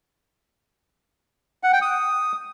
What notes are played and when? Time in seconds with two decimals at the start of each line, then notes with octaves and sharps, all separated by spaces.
1.63 F#5
1.73 G5
1.82 D#6